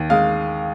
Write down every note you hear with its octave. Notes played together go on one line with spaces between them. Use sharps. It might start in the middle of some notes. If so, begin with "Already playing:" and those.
Already playing: D#2
G#3 F5